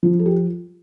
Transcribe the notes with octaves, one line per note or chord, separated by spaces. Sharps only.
F3 F4
A4
G4